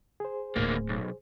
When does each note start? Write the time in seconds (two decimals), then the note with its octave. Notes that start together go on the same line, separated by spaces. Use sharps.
0.20 G#4 C5
0.56 D1 D2 A2 A#3
0.89 B1